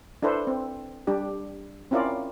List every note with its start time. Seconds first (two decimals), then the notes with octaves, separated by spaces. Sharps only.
0.22 D4 E4 A4 B4 C5
0.47 C4
1.07 G3 D4 G4
1.91 C4 C#4 E4 F4 A#4 D5